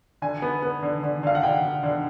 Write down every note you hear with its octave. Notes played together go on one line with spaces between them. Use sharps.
D3 G#5
B3
B3
D3
D3
D3 F5
F#5
D3 G5
D3
D3